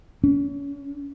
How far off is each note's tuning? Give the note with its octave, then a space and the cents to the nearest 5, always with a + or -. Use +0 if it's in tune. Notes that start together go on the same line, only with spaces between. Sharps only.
C#4 +35